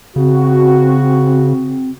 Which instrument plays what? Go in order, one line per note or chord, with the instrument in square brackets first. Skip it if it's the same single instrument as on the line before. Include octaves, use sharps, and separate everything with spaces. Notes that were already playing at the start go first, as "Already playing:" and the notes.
[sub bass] C#3 [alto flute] C4 [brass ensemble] F#4